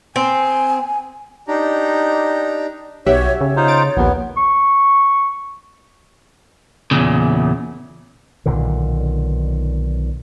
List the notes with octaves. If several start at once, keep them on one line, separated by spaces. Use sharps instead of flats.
C4 G#5
D4 D#4 G4 A#5
B1 F#4 G4 C#5 E5 F#5
C#3 C#5
D#4 F4 C5
A6 D7
A#1 D#2 B3
C#6
E2 A#2 C#3
B1 A#2 D3 D#3